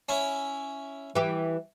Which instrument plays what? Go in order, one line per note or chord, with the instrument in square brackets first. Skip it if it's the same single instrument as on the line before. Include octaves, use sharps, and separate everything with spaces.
[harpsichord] C#4 E4
[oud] E3 G4